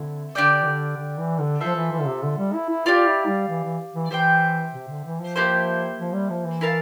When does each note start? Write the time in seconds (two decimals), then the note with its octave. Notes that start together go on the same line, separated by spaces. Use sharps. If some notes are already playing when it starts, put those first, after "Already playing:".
Already playing: D3 A3 C4 E4
0.34 D3 D4 G4 D5 G5
0.62 E3
0.66 D3
0.97 D3
1.18 E3
1.39 D3
1.60 F3 F4 A4 C5 E5
1.75 E3
1.92 E3
2.00 D3
2.07 C3
2.23 D3
2.38 G3
2.53 E4
2.69 E4
2.86 F4 G4 D5 F5
3.06 E4
3.27 G3
3.48 E3
3.64 E3
3.94 E3
4.11 E3 G4 C5 E5 G5
4.73 C3
4.88 D3
5.05 E3
5.20 F3
5.36 A#3 E4 G4 C5
5.98 F3
6.14 G3
6.30 F3
6.45 E3
6.61 E4 A#4 F5 A5